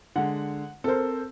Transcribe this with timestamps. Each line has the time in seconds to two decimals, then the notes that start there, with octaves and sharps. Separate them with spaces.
0.16 D3 G#3 F#5
0.84 C4 A4 A#4 C5